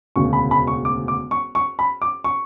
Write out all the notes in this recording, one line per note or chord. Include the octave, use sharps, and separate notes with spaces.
E1 D2 C#3 C#6
B5
B5
C#6
D6
D6
C#6
C#6
B5
D6
C#6